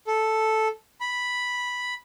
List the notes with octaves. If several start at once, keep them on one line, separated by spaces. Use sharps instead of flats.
A4
B5